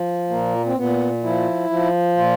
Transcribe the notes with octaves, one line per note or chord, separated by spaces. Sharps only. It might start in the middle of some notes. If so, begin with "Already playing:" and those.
Already playing: F3
A#2 A#3
C4
A#2 B3
F3 E4
F3
A#2 F4